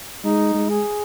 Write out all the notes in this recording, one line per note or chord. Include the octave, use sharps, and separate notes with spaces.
G#3 D#4
G#3
G#4